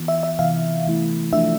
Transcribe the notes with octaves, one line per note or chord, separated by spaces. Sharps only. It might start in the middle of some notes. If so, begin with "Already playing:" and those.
Already playing: E3 B3 F4
E5
E5
C3 E3 B3 F5
E3 A3 E4
F3 A3 D4 F4 E5